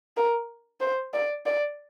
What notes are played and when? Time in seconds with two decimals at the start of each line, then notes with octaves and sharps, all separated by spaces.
0.17 A#4
0.81 C5
1.13 D5
1.46 D5